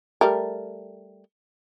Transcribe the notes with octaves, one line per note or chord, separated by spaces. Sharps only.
G3 A3 A#4